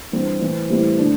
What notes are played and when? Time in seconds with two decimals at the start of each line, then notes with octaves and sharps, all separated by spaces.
0.12 G2 E3 C4 E4
0.40 A2 E3 C4
0.69 A2 E3 G3 C4
0.98 D3 A3 D4